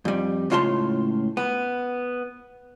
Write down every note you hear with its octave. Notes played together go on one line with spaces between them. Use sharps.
F2 G3
C#2 A2 F4 C#5 A5 C6
B3